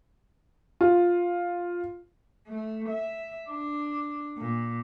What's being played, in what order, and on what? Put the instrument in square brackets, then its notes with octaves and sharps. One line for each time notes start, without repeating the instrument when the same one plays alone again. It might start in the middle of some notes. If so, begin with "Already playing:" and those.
[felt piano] F4
[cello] A3
E5
D4
A#2